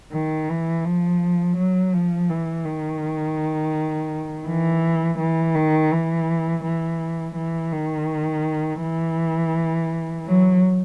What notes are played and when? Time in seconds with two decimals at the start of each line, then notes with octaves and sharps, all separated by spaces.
0.13 D#3
0.49 E3
0.85 F3
1.57 F#3
1.93 F3
2.29 E3
2.65 D#3
4.47 E3
5.19 E3
5.55 D#3
5.91 E3
6.64 E3
7.36 E3
7.72 D#3
8.82 E3
10.26 F#3